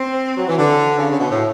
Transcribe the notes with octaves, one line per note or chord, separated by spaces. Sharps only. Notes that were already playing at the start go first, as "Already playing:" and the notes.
Already playing: C4
F#3
E3
D3
C#3
C#3
B2
A2